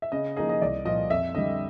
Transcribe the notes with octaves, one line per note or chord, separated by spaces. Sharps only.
E5
C#3 D#5
F3 A#3 D#4 G#4 D#5
D#5
C2 D5
A#2 F3 D#5
F2 E5
D3 G3 D#5